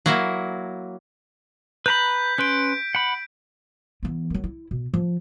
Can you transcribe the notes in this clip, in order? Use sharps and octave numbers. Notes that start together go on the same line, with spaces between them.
F#3 A#3 E4
B4 A#5 B5 G6 B6
C#4 B4 C6 G6 D7
F#5 B5
E3 B3
D#3 F#3
E4
B2
F3